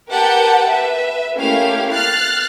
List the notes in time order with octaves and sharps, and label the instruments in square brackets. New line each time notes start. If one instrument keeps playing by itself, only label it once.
[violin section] G4 A#4 B4 F#5 G5 A5
B4 E5
A3 A#3 C#4 E4 G4 F5
F6 F#6 A6 C7